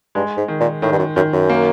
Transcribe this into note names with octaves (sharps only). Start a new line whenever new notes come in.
G2 G#3
G#2
D#3
A#2
A2 D#3
G2
F#2
F#2 D#3
F#2
A#3